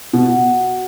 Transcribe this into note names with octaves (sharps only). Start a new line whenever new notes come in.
B2 F#4